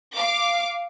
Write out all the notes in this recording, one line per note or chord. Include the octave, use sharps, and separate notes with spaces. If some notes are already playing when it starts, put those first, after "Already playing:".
F5 D6